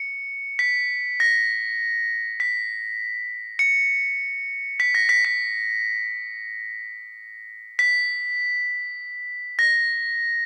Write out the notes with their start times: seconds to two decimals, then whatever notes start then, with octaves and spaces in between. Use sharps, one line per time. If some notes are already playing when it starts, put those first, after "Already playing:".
Already playing: C#7
0.59 B6
1.20 A#6
2.40 B6
3.59 C#7
4.80 B6
4.95 A#6
5.09 B6
5.25 B6
7.79 B6
9.59 A#6